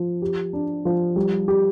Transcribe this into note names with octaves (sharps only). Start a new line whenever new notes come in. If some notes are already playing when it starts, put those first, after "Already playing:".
Already playing: F3
G4
D4
F3
G3
G4